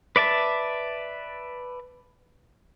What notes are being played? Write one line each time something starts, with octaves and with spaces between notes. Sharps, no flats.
B4 D5 E5 A5